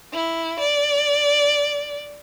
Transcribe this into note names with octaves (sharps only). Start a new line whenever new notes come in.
E4
D5